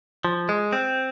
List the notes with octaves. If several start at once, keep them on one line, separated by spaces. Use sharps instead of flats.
F3
G#3
C4